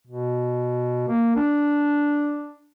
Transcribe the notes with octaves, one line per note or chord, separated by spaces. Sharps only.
B2
A#3
D4